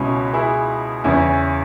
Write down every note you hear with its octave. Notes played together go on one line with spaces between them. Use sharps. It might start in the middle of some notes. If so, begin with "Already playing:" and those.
Already playing: C#2 B2 C#4 E4
E4 G#4
E2 C#3 E3 C#4 E4